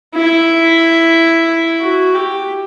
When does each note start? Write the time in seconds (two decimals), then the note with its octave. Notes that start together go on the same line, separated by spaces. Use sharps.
0.15 E4
1.80 F#4
2.15 G4